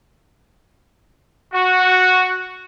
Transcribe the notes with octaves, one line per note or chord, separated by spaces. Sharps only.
F#4